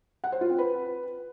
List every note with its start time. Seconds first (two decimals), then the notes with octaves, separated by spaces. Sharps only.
0.24 F#5
0.32 C5
0.41 F4
0.50 C4
0.58 B4